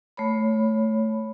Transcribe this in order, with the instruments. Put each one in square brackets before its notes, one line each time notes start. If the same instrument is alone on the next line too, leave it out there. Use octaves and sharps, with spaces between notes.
[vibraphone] A3 C#5 B5